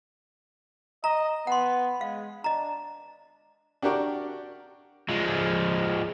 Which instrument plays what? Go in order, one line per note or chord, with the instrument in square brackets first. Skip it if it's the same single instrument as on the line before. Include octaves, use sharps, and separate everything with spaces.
[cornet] D#5 [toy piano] A#5
[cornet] B3 [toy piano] F#5 C6
[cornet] G#3 [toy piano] F5
[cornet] D4 [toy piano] D#5 A#5
[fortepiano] D4 F#4 G4 A#4 D5 C#6
[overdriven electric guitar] F3 G#3